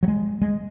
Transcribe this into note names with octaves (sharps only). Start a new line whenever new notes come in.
F#3
G#3
G#3